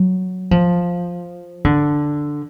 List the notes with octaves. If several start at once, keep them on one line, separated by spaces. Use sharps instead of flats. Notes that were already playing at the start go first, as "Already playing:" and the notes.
Already playing: F#3
F3
D3